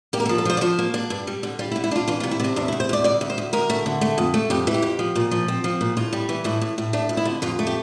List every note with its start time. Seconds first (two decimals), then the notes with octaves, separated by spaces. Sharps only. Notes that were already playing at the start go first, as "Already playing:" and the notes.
0.13 A#3 G4
0.20 A#4
0.26 A4
0.29 F3
0.38 A4
0.45 F3 C5
0.57 D5
0.61 F3 C5
0.79 A#3
0.94 D4
1.10 G2
1.27 G3
1.43 D3
1.59 G3 F4
1.71 E4
1.76 D3
1.84 E4
1.91 D4 F4
2.08 E3 F4
2.20 F4
2.23 C3
2.31 E4
2.40 C3 D4
2.56 E2 D4
2.68 E4
2.73 E2
2.80 C5
2.89 E2 D5
3.04 D2 D5
3.21 D2
3.30 C5
3.38 D2
3.53 D2 A#4
3.70 A3
3.86 D3
4.01 A3
4.18 F2
4.34 A3
4.50 F2 G4
4.67 E3
4.74 G4
4.82 F2
4.99 F3
5.15 A#2
5.31 F3
5.48 C4
5.64 F3
5.81 A#2
5.97 A2 F4
6.13 G3
6.29 E3
6.44 A2 E4
6.61 A2
6.78 A2
6.93 A3 D4
7.09 F2
7.17 E4
7.25 D3
7.42 F2 F4
7.59 A3
7.67 G4